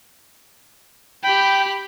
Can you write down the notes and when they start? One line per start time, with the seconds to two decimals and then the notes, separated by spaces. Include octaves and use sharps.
1.24 G4 G5 B5